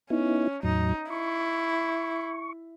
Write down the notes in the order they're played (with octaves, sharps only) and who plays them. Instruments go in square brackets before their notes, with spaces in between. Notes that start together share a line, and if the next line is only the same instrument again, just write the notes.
[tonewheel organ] B3 D#4 E4 [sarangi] C#4
[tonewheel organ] E2 A2 F#3 [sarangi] D#4
[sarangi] E4 [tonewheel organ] C#6